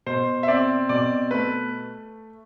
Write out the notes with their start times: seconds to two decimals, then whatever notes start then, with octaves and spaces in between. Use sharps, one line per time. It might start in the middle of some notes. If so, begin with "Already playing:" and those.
0.06 B2 C5
0.43 E5
0.48 C4 D5
0.89 B2 D5
1.31 A3 B4